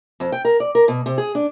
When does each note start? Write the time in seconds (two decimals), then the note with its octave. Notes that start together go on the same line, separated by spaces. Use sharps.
0.20 F2
0.32 G5
0.45 A#4
0.60 D5
0.75 A#4
0.88 B2
1.06 C3
1.18 G#4
1.35 D4